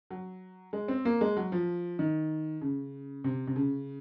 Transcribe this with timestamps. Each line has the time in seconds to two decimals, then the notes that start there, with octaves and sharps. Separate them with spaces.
0.11 F#3
0.73 G#3
0.88 C4
1.05 A#3
1.21 G#3
1.37 F#3
1.52 F3
1.99 D#3
2.61 C#3
3.24 C3
3.47 C3
3.56 C#3